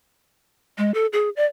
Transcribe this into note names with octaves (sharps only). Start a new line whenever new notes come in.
G#3
A4
G#4
D5